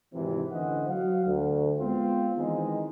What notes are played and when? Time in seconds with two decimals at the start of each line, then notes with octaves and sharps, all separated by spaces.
0.14 G#1 C3 E3
0.51 A1 D3 E3 C5 D#5 F#5
0.87 F#3 F5 F#5
1.25 D2
1.79 G#3 B3 C4 F4
2.37 D#3 E3 G#3 B3 C4 D#4